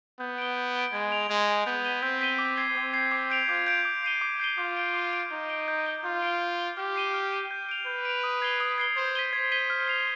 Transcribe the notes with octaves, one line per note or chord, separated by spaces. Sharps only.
B3 G6
D7 G7
G6
D7 G7
G#3 G#6
D7 F7
G#3 G#6
D7 F7
B3 G6
B6 D#7 G7
C4 G6
B6 D#7 G7
D6
G#6 C7
C4 D6
G#6 C7
D6
G6 D7 F7
F4 D6
G6 D7 F7
D6
G6 C7 D#7 G7
D6
G6 C7 D#7 G7
F4 D6
G6 D7
D6
G6 D7
D#4 G6
D7 G7
G6
D7 G7
F4 G6
D7 G7
G6
D7 G7
G4 F6
C7 D#7 G7
F6
C7 D#7 G7
G6
D7 F7
B4 G6
D7 F7
D#6
G#6 C7 G7
D#6
G#6 C7 G7
C5 G#6
B6 D#7 G7
C5 G#6
B6 D#7 G7
F6
C7 F7